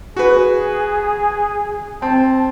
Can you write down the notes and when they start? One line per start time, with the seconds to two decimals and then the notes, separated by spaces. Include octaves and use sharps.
0.17 F#4 G#4 B4
2.02 C4 A5